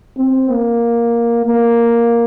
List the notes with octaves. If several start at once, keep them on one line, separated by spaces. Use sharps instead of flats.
C4
A#3
A#3